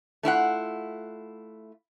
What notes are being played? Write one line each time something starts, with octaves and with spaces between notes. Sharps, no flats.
A3 E4 F4 F#5